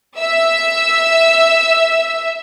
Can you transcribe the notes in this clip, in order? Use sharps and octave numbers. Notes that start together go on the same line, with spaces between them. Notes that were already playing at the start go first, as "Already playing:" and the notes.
E5 E6